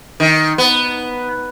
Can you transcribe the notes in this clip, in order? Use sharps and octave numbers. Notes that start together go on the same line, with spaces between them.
D#3
B3